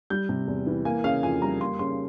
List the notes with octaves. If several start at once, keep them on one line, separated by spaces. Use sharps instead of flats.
G3 G6
C3
E2
E3
A#3 G#5
C#3 F5
F2 G#5
G3 A#5
A#3 C6
C#3 C6